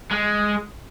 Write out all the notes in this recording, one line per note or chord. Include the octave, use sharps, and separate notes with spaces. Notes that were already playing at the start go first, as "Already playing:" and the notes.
G#3